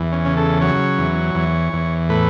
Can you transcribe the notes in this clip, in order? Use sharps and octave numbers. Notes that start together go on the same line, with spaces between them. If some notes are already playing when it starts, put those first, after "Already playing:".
Already playing: E2
C#4
C#3
A4
F#3 C#5
E2
E2
E2
A2 B4